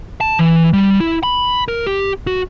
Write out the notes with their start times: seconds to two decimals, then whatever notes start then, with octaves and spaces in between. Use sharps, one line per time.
0.21 A5
0.39 E3
0.73 G3
1.00 E4
1.23 B5
1.68 A#4
1.87 G4
2.27 F#4